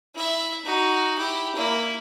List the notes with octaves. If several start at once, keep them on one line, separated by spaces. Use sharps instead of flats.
E4 E5
D#4 F#4
E4 G4
A#3 E4